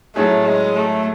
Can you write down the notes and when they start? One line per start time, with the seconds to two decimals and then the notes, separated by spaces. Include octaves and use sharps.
0.16 A2 F#3 A3 C#4 G#4
0.46 G#3
0.77 A3